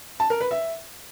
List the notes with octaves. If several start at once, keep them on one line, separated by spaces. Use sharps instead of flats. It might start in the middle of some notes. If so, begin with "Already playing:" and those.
A5
A#4
B4
E5